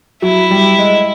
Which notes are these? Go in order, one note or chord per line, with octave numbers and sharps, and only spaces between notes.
F#3 E4
G3
G#3